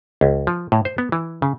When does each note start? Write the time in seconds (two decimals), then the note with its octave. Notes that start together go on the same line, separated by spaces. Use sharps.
0.21 C#2
0.47 F3
0.72 A2
0.85 C5
0.98 B3
1.12 E3
1.42 C#3